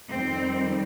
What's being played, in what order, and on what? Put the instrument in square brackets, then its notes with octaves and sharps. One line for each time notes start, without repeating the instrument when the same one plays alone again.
[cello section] F2 D#3 G3 C4